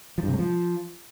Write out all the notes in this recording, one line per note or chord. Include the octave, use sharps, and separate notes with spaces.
F3
G2
C3
G#3
F3